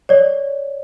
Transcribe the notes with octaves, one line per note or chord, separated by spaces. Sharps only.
C#5 D5